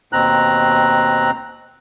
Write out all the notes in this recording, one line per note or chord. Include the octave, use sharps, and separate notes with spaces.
D#2 B2 C4 A#5 F#6